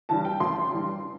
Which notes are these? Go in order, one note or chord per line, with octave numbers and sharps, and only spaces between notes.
G2 E3 G3 A5
G5
A1 C6
G2 E3 G3